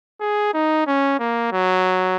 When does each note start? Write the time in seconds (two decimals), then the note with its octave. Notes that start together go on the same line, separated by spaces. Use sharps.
0.21 G#4
0.54 D#4
0.87 C#4
1.19 A#3
1.52 F#3